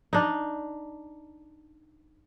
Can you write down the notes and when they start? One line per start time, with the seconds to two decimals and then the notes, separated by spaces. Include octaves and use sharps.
0.13 D4 D#4